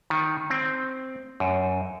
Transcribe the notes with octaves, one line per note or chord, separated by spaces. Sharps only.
D#3
C4
F#2